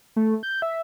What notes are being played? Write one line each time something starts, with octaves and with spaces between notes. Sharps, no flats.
A3
G6
E5